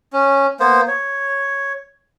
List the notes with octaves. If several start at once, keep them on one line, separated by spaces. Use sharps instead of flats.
C#4
A#3 B3 C5
C#5